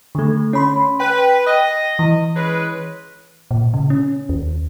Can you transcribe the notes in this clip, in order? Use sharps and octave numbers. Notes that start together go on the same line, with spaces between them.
D3 A3
C#4 B5 C6
B4 G5
D#5
E3
G#3 C#4 B4
A#2
C#3
C#4
D#2